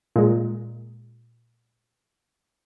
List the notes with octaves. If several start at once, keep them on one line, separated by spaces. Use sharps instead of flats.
A#2 G#3